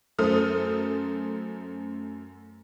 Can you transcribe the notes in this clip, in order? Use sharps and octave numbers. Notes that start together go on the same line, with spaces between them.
F#2 A3 A4 C5 D#6 F6